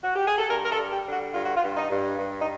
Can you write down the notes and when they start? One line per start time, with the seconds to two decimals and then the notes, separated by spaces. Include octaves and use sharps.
0.04 F#4
0.15 G4
0.27 G#4
0.38 A4
0.50 G2 A#4
0.65 A#4
0.71 A4
0.78 G3
0.92 G4
1.06 D3
1.13 F#4
1.34 G2 F4
1.45 F#4
1.56 F4
1.62 G2
1.77 D#4
1.90 G2
2.19 G2
2.40 D#4